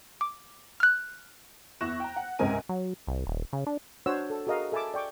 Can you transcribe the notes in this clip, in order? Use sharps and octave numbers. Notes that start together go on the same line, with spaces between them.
D6
F6 F#6
E2 E4 C#6 F#6 A#6 E7
G5 A#5
F#5
C#2 G#2 C3 A#4 G#5 D#7
F#3
C2
D#1
C#3
D4
D4 F#4 C5 C#5 F#5 E6
A4
F#4 G#4 A#4 D#5 F5
A4 E5 G#5 A5 B5 D6
D5 G5 C#6 D6